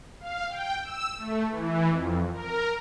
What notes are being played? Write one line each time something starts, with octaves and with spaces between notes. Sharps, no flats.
F5
G5
E6
A3
E3
F2
A#4